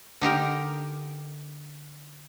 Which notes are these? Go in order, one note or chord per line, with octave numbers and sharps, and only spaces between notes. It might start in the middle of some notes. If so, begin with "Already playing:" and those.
D3 D#4 G4 A#4